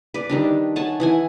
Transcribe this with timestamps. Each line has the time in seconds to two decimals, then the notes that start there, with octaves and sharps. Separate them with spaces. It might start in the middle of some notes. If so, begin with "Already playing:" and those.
0.14 B4 D5
0.30 D#3 G3 D4
0.76 C#5 F#5 G#5 A5
1.00 E3 F#5 G#5